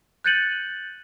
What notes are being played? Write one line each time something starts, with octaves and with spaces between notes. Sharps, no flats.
F#6 G6 A6 C#7 D#7 F#7